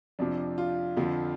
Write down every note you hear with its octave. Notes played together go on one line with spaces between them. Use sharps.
F2 C3 F3 D4
F4
F2 D3 F3